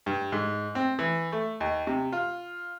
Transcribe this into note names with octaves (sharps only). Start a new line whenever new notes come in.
G2
G#2
C4
E3
A3
D#2
C3
F4